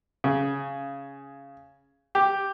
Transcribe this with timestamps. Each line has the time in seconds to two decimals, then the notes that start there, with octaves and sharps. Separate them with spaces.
0.24 C#3
2.15 G4